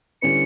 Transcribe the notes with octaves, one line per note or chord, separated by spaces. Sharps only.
D3 G3 C#4 E4 B4 C#7